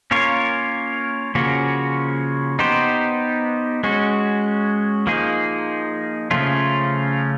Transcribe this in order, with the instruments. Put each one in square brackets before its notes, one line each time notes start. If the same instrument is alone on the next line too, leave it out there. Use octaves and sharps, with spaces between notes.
[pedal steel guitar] A#3 C#4 F4 A#4 C#5
C#3 F3 A#3 C#4 F#4
B3 D#4 G4 C5
G#3 C#4 F#4
F3 A#3 D#4 G#4
C#3 F3 A3 C#4 F4